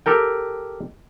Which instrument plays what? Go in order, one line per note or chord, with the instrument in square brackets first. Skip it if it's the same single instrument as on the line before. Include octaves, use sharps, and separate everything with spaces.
[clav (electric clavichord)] G4 A4 A#4 G5